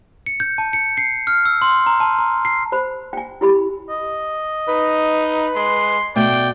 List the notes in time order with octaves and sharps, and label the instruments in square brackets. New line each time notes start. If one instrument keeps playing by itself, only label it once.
[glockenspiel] C#7
G6
A5
C#7
C7
F6
E6
C6
A#5
A5
A#5
C7
[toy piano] C5 B5
G5 G#5
E4 G4 B5
[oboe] D#5
[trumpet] D#4 [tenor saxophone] B4
[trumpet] G#3 [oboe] C6
[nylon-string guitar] B2 A3 E5 [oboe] D5 [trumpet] G5